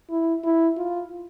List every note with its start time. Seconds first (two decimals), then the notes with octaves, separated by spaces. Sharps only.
0.10 E4
0.44 E4
0.77 F4